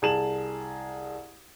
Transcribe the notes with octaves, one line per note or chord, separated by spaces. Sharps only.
C2 G#4 A5 E7 F#7